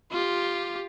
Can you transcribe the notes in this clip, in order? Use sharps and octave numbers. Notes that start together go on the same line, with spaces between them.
F4 G4